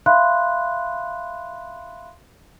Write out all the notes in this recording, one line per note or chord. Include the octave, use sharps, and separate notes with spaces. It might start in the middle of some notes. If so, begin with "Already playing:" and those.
E5 F5 B5 C6 F#6